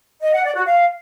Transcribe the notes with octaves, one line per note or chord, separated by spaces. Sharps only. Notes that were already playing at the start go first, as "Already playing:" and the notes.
D#5
F#5
D5
F#4
F5